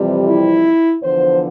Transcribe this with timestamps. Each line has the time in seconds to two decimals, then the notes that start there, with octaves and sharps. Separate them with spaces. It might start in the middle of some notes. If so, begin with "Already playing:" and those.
Already playing: F2 C3 E3 G3
0.26 E4
1.01 E2 D3 F3 C5